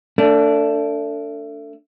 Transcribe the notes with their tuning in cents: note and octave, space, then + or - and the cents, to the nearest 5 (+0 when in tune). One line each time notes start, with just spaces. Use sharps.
A3 +30 D4 -15